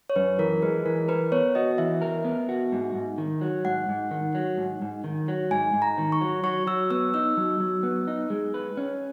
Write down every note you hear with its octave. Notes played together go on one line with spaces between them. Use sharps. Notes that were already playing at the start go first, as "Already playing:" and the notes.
C#5
F#2 B4
E3 A#4
G#3 B4
E3 A#4
A#4 B4
B3 C#5
F#4 D#5
E3 E5
A#4
B3
F#4
G#2
G#2
D#3
F#3
G#2 F#5
G#2
D#3
F#3
G#2
G#2
D#3
F#3
G#2 G#5
G#2
A#5
D#3
C#6
F#3
F#3 C#6
F#3 E6
B3 E6
D#4 E6
F#3
F#3
B3
D#4
G#3
B4
C#4